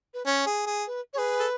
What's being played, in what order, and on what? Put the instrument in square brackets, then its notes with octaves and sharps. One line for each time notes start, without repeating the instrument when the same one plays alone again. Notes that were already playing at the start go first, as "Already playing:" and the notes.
[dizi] B4
[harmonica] C#4 [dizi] C#5
[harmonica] G#4
G#4
[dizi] B4
C#5
[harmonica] G#4 [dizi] B4
[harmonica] A4